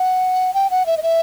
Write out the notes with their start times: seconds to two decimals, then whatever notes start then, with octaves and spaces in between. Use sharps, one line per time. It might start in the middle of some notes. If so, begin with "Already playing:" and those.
Already playing: F#5
0.54 G5
0.70 F#5
0.86 E5
0.97 D#5
1.03 E5